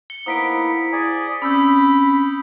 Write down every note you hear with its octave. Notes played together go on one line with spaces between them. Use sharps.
C#7 G7
A#3 B3 D#4 E4 C5 D#6 B6 D7
G#4 D5 G#5
C4 C#4 B5 D#6 E6 G6